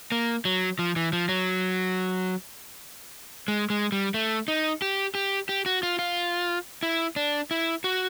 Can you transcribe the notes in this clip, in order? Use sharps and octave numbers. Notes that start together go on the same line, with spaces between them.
A#3
F#3
F3
E3
F3
F#3
G#3
G#3
G3
A3
D#4
G4
G4
G4
F#4
F4
F4
E4
D4
E4
F#4